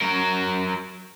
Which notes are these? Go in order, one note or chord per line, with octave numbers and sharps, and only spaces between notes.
F#3 A#4